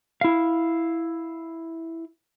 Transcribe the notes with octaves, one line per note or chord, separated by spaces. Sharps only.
E4 F5